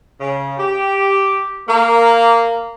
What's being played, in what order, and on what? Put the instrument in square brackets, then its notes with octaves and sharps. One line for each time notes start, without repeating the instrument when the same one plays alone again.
[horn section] C#3
G4
A#3